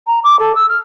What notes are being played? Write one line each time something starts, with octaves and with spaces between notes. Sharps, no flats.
A#5
D6
A4
E6
F6